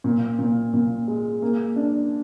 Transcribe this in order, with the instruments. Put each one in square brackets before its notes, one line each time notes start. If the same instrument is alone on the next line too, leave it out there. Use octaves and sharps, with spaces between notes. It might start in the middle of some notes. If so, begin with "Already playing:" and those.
[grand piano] A#2
A#2
A#2
G#3
A#3
D4